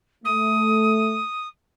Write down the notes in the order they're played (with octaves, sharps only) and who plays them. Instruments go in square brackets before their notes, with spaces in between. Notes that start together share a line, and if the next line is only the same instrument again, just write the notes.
[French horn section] A3 [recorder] D#6